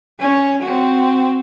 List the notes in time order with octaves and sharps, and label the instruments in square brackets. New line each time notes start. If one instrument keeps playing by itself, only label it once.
[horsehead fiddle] C#4 C#5
C4 F#4